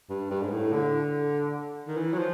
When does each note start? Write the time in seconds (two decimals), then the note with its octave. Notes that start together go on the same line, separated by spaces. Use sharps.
0.10 G2
0.31 G2
0.43 G#2
0.52 A2
0.73 D3
1.88 D#3
1.97 E3
2.14 F#3
2.18 F3